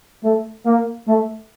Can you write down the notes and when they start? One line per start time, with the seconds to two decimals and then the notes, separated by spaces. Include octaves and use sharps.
0.22 A3
0.65 A#3
1.08 A3